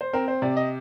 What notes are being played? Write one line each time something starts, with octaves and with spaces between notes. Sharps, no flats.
C5
C4 A#4
C5
C3 D5
D#5